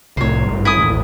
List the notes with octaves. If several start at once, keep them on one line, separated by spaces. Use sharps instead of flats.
C2 A2 C5 C#5
G#1 G2
E4 G#5 D#6
A1 D#2